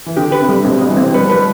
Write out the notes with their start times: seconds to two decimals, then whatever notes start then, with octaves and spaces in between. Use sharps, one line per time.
0.06 E3
0.17 D3 G4
0.32 B4
0.40 C3
0.49 G3
0.65 B2 C4
0.81 G3
0.89 E3
0.97 C4
1.14 G3 B4
1.24 F3
1.30 B4
1.35 G3